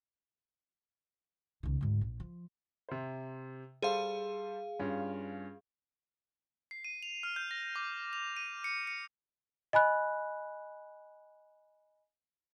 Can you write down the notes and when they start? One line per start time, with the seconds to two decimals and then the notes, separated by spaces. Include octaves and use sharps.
1.63 C#2 D#3
1.81 D2 G#2
2.01 A#1
2.20 F3
2.89 C3 C5
3.82 G3 G#4 A4 C5 F5
4.79 G2 C#4 F4
6.71 C7
6.85 D#7
7.03 F7
7.23 F6
7.36 G6
7.51 A#6
7.76 D6
8.13 F7
8.36 D#7
8.64 C#7
8.87 C#7
9.73 D#5 G#5 B5 F#6